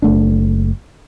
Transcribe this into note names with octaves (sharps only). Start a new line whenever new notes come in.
F#1 A3 D4